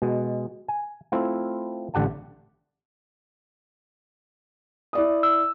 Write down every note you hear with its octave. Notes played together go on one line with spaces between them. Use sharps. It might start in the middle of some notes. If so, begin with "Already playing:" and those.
B2 G#3
G#5
A3 C4 E4 F4
A1 D3 G4 F#5 A5
E4 D5 D#6
E6